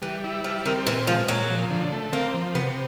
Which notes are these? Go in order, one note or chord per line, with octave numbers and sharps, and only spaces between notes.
E3 G3
E4
F3 G3
D#3 C4
A#2 E3
F3 G#3
A#2 F#3
F3
D3
A3
A#3 C4
F3
C3 B3